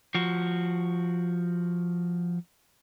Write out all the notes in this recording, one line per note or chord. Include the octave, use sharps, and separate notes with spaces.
F3 F#4